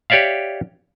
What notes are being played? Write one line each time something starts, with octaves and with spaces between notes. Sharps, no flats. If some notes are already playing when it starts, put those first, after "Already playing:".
G4 C#5 D5 E5 F5